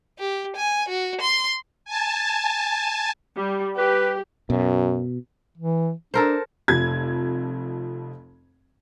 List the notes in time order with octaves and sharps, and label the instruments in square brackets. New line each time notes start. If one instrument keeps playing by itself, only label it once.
[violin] G4
G#5
F#4
C6
[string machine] G#5 A5
[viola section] G3
[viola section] G4 [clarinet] B4
[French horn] F#2 [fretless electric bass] B2
[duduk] E3
[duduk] D4 [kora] A4 A#4 C5
[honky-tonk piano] F1 F2 G#6